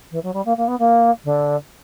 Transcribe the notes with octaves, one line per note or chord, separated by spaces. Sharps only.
E3
F#3
G3
A#3
A#3
B3
A#3
D3